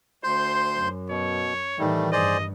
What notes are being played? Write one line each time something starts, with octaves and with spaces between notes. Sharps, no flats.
D2 C5 C6 G6
F#2
B2 C#5
A2 D#3 E3 G3 A3
G2 G#4 C5 D5 D#5